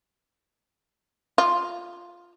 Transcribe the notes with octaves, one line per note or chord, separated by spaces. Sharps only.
F4